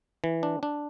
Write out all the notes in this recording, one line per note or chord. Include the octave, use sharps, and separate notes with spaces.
E3
D4
D4